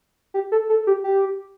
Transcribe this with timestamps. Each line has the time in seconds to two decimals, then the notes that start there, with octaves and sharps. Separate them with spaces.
0.34 G4
0.52 A4
0.69 A4
0.87 G4
1.04 G4